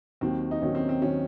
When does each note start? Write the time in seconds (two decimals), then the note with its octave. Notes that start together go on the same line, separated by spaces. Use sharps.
0.21 D#2 D#3 F#3 C4
0.51 D#4
0.62 D#2 D#3 F#3 C#4
0.75 C4
0.89 C4
1.02 D#3 F#3 C#4